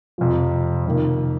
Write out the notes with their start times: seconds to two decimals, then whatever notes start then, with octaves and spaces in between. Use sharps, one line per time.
0.18 F2 C3 F3
0.86 F2 C3 D#3 A#3